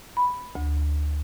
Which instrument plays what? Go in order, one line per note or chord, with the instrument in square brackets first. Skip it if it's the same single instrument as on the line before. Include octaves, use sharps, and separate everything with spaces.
[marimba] B5
D2